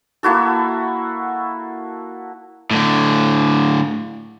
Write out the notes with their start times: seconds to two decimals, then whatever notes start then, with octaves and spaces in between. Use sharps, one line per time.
0.23 A#3 E4 F#4 A4
2.71 A2 D3